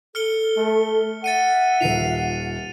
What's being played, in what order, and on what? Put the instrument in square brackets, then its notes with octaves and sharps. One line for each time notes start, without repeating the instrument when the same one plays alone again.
[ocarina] A4 [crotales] F6 C#7 G7
[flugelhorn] A3
[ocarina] E5 [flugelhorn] F#5 [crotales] A6 C#7 D#7
[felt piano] D#1 D#3 F3 [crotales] C7 D#7 F7